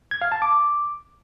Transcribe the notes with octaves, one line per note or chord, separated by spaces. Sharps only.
G#6
F5
A5
D6